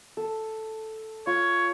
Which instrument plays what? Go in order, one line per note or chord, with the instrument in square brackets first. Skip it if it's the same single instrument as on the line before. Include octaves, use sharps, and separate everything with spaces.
[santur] A4
[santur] F4 [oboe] C#5